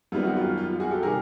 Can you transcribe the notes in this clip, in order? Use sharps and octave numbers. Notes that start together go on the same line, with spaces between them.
F#2 D#3 G3 B3 F4
F#4
F4
F4
F#4 G#4
G4 A4
C3 D#3 G3 G#4 A#4